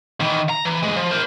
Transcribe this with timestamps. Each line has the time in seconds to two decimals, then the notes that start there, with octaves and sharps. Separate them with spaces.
0.21 D#3 E3
0.49 A#5
0.65 E3
0.83 D2 G#3
0.96 F3
1.11 A#4 C5